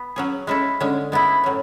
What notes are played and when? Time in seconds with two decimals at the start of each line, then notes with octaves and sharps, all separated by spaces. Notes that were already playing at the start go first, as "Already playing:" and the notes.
Already playing: B3
0.16 F#3 C#4 G#4
0.47 G#3 C#4 E4 A4
0.80 D3 G#3 C#4
1.12 G#3 B3 E4
1.44 A2 F#3 C#4